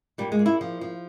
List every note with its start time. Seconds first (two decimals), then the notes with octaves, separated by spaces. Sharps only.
0.18 A#2 G3
0.32 G#3
0.39 A#2
0.46 E4
0.61 F3
0.81 F3